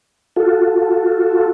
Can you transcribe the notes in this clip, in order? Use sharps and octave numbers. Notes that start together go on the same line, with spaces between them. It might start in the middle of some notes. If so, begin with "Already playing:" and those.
F4 F#4 A4